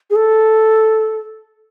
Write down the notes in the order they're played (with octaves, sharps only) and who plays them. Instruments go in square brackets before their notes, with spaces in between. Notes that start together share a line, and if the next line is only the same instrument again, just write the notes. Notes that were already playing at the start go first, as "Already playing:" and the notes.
[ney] G#4
A4